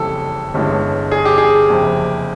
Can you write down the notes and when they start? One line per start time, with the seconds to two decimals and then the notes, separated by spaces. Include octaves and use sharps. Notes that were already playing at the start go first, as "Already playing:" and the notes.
Already playing: F#1 F2 C#3 E3 G3 A4
0.54 G1 G2 E3 G#3 C#4
1.11 G#4
1.25 G4
1.38 G#4
1.70 F#1 F2 C3